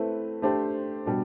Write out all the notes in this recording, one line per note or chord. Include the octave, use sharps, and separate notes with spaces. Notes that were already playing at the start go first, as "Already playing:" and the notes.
Already playing: A3 C4 E4 B4
A3 D4 G4 C5
B2 G3 D4